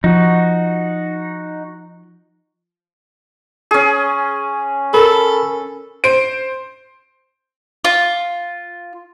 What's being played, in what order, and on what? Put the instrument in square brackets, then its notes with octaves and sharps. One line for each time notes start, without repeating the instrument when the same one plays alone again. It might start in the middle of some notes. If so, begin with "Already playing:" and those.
[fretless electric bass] F3 [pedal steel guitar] D#4 F#4
[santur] C#4 G#4
[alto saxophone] A4 [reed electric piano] A#4 B5
[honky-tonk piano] C5 D7
[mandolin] F4